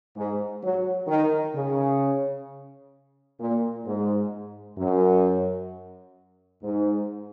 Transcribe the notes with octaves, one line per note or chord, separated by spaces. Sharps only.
G#2
F#3
D#3
C#3
A#2
G#2
F#2
G#2